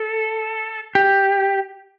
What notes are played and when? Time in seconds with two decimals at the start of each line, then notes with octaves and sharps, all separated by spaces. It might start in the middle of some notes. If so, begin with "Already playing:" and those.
Already playing: A4
0.95 G4